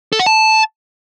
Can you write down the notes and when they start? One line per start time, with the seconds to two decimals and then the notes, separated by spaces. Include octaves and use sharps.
0.13 A4
0.19 F#5
0.26 A5